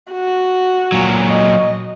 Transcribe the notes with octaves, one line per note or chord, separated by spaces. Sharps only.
F#4
A#2 F#3
D#5